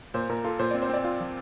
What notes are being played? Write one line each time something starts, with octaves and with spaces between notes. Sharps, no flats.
A#2 C5
A#2 A#4
F4 A4
A#2 C5
C4 D5
C5
C4 D5
F4
F3